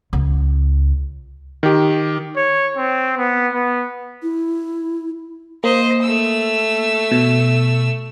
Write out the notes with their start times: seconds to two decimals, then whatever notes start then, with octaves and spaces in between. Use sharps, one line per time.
0.13 C#2
1.63 D#3 G4
2.36 C#5
2.77 C4
3.18 B3
3.53 B3
4.23 E4
5.64 A#3 C5 D#5
6.02 A3 E6
7.11 B2